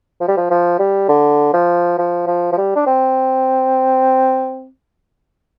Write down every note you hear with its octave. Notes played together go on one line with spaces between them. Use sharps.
F3
G3
F3
F3
G3
D3
F3
F3
F3
F3
G3
D4
C4